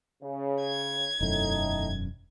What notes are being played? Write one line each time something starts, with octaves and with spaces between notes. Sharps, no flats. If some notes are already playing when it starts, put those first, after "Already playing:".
C#3
G#6
E1 F#2 A2 D#4